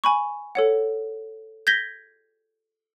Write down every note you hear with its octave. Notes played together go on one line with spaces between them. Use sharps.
G#5 B5 C#6
A4 C#5 F#5
G6 G#6 A#6 B6 G7